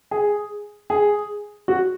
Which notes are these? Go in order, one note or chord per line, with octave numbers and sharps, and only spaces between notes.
G#4
G#4
F#4